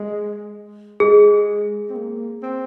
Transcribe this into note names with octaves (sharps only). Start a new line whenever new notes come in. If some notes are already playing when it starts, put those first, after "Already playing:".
Already playing: G#3
G#3 G#4
C4
A#3
C4